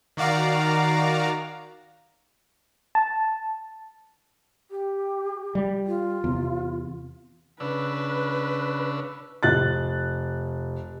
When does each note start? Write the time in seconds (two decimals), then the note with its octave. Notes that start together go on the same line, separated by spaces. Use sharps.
0.17 D#3 F#4 D5 F5 A#5
2.95 A5
4.71 G4
5.55 G3
5.87 F4
6.24 E2 C3
7.60 C#3 D4 B4 E6
9.43 F1 F#6 A6